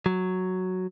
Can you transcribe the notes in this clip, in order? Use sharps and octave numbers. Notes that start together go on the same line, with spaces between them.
F#3